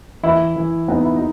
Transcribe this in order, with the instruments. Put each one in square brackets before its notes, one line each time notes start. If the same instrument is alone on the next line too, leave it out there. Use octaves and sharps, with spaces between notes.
[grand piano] E3 [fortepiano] E4
[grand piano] E3
[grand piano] B3 [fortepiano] D#4
[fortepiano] E4
D#4